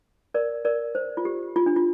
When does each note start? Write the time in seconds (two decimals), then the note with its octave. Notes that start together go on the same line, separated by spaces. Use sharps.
0.34 A#4 D5
0.65 A#4 D5
0.95 C5
1.17 F4
1.25 G4
1.56 F4
1.66 D4
1.76 F4